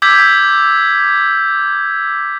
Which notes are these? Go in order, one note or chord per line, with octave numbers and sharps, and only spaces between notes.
D6 E6 G6 G#6 B6